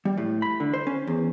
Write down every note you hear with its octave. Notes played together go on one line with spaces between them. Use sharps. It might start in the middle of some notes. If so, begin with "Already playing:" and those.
G3
A2
B5
D3
C5
C#4
E2